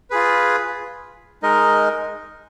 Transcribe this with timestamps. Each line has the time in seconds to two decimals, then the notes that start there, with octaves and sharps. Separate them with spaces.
0.10 F4 G#4 B4
1.42 G#3 D#4 A#4 D#5